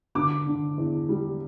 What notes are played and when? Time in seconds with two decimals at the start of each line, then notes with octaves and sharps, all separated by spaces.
0.15 D3 D6
0.47 D3
0.78 E2
1.09 G3